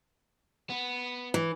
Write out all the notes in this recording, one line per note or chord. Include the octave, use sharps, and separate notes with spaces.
B3
E3